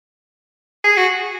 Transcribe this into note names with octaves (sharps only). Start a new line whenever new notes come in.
G#4
F#4